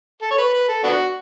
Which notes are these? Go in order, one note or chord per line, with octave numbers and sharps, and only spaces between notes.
A4
C#5
B4
B4
A4
B3 D4 F#4